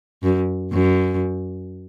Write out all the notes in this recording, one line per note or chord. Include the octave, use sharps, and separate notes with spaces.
F#2
F#2